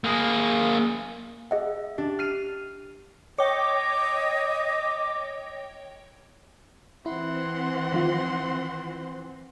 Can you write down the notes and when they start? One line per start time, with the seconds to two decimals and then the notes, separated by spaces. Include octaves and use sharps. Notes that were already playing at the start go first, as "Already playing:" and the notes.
0.04 A#3 G#4
1.51 G#4 D#5 E5 F#5
1.98 D4 G4
2.19 F6 C7 D#7
3.38 C#5 D#5 G5 D6
7.06 E3 C4 E4 F#5 C6
7.92 D#3 F3 F4